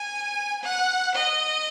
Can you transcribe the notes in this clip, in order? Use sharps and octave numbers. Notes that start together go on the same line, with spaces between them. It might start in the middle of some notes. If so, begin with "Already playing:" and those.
Already playing: G#5
F#5
D#5